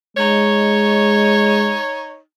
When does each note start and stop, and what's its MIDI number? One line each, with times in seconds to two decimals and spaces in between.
0.17 1.79 56
0.17 2.19 63
0.17 2.19 73